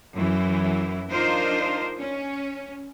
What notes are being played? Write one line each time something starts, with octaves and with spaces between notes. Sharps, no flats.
F#2 E3 E4
D4 D#4 F4 A#4 C5
C#4